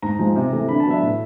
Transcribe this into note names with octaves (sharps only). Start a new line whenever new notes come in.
G#2 A#5
F3 G#3
C3
E3 A3
D3 B5
A5
F#3 B3 D4 E5
A2